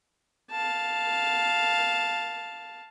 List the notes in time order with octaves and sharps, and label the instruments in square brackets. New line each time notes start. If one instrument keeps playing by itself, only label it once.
[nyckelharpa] F5 A5